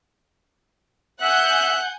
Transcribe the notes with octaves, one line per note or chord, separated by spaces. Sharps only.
E5 F#5 G#5 F#6 G6